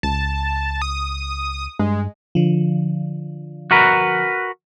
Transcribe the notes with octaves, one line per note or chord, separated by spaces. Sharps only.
C#2 A5
D#6
G2 G#3
D3 F3
F#4 A#4 B4